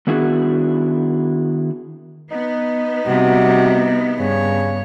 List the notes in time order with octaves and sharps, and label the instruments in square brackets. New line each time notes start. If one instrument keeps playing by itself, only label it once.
[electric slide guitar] D#3 B3 D4 E4 F#4 G#4
[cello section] B3 [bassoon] D#4
[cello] C3 G3 [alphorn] F#4
[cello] G2 C#5 [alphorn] C#3